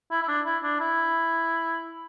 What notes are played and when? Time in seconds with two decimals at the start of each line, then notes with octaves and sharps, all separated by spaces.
0.11 E4
0.23 E4
0.28 D4
0.46 E4
0.63 D4
0.80 E4